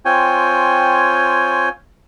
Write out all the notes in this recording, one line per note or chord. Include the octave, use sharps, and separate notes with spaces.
C4 F4 C#5 G5 G#5